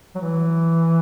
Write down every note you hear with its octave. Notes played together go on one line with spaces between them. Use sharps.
F#3
E3